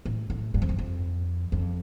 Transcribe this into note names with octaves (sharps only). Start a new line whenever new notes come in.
A2
A2
G2
F2
G2
F2
F2